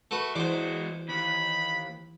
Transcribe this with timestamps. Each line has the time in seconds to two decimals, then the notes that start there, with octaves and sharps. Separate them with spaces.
0.11 A3 F#4 B4
0.36 E3 G#3 F#4 C5 D5
1.09 D#2 B5